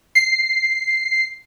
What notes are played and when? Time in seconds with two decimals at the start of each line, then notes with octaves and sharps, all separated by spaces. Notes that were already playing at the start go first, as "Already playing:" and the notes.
0.15 C7